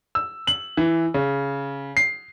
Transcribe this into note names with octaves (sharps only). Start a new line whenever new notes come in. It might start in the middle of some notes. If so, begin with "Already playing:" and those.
E6
F#7
E3
C#3
C7